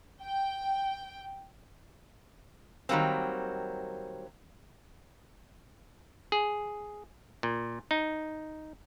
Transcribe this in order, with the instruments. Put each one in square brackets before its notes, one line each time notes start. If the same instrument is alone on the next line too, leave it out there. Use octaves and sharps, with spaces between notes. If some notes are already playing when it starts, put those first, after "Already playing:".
[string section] G5
[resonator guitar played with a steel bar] D#3 F#3 G3 A#3 C4
[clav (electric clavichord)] G#4
A#2
D#4